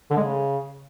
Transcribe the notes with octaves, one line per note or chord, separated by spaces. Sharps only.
D3
G#3
C#3